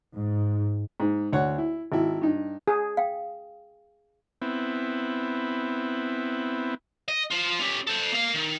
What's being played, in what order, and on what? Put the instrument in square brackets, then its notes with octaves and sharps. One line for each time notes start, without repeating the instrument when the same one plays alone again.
[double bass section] G#2
[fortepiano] G#2
D2 C#5 F#5
E4
G#1 E4
G2 D#4
[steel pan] G#4
[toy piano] F5 G5
[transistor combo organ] B3 C4 E4
[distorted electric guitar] D#5
F4 C5
C#4 G4
A4 C5
A#3 F5
D#3